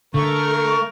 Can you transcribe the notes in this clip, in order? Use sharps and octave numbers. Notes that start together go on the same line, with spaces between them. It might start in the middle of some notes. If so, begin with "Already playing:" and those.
D3 A3 A#4 C#6